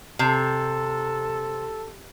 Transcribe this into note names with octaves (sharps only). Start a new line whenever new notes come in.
C3 A4